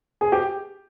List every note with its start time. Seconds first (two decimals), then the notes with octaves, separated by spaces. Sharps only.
0.21 G#4
0.32 G4